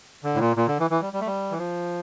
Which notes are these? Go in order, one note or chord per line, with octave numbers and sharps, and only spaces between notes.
D3
A2
A#2
A#2
D3
E3
E3
G3
G3
A3
G3
E3
F3